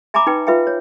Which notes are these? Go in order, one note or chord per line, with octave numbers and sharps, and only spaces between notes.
E5 G#5 A#5 B5 D6
D#4 B4 G5
F4 B4 E5 F5 G5
C#5